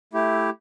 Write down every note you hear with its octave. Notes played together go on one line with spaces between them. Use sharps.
A3 E4 G4